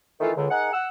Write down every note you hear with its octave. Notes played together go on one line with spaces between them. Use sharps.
D#3 E3 A3 F4 A4
C#2 D3
D#4 G#4 A#4 F#5
F#5 E6